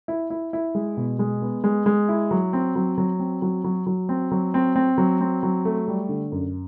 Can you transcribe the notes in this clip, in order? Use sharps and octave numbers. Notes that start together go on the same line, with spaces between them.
E4
E4
E4
G#3
B2
G#3
B3
G#3
G#3
E4
F#3
C4
F#3
F#3
C4
F#3
F#3
F#3
C4
F#3
C4
C4
F#3
C4
F#3
A3
G3
D3
F#2